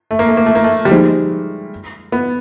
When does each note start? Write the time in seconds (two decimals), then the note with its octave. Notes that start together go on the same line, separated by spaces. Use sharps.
0.11 A3
0.19 A#3
0.28 A3
0.37 A#3
0.46 A3
0.55 A#3
0.64 A3
0.85 G3
0.90 F3 G#3 A#3 D#4 G4 C5
2.12 B3